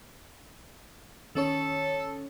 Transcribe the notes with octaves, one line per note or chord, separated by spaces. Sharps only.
D#3 C#4 A4 C#5